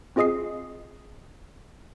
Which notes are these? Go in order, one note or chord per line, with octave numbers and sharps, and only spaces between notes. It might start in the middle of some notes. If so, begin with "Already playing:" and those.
C4 F4 G#4 D#5 D#6 C7